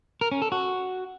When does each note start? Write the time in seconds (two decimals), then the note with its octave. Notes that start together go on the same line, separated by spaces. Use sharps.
0.21 A#4
0.32 C#4
0.42 A4
0.52 F#4